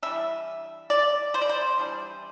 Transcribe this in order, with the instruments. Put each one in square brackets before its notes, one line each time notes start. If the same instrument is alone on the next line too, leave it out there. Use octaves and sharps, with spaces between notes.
[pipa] E3 G3 D4 E5
D5
C5
D5
C5
E3 G3 D4